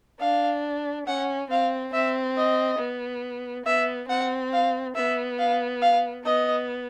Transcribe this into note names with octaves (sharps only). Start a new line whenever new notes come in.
D4 F5
C#4 F#5
C4 F5
C4 E5
D#5
B3
B3 E5
C4 F#5
F5
B3 E5
F5
F5
B3 D#5